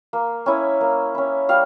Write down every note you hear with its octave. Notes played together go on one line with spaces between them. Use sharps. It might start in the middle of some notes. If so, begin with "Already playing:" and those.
A#3
C#4 E4
A#3
C#4 E4
G3 F5